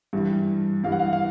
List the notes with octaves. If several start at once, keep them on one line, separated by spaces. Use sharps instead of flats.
G2 E3 G3
G2 E3 G3 F5
F#5
F5
F5